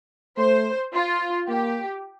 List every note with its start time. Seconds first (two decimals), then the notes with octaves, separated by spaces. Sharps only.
0.38 A3 C5
0.94 F4
1.49 A#3 G4